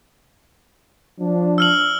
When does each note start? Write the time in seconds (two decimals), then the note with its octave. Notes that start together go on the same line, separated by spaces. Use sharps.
1.20 F3 D4
1.58 E6 F6 F#7